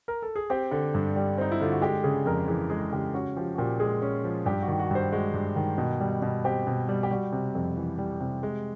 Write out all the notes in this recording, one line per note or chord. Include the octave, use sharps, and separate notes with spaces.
A#4
A4
G#4
C4 G4
D3
G2
G3
C4 D#4
E4
D3 F4
F#4
G#3 G4
C#3 G#4
F2 A#4
E3 G#4
G#3 G#4
C#3 G4
C#4 F#4
F3 G4
F#4
A#2 G4
G#3 G#4
C#4
F3
G2 G4
F#4
D#3
F#4
G2 C5
G#3 F#4
G2
D#3
B2
G3
B2
C4 G4
B2
G3
G4
G3 F#4
C3
F2
E3
G3
C3
G#3